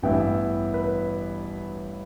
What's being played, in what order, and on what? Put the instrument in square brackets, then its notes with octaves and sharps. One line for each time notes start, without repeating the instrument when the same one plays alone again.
[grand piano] A1 G2 E3 B3 E4 G5
E5
B4